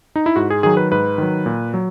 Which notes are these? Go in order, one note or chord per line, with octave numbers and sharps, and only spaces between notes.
D#4
E4
G#2 F#4
G#4
D#3 F#3 G#4
B4
G#2 B4
D#3 F#3
A#2
F#3